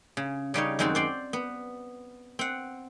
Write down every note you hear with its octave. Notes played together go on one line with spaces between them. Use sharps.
C#3
C#3 G3 D#4 C#5
F#2 D#3 G#3 C4 F#4
C5 D5 G5
B3
C4 F#5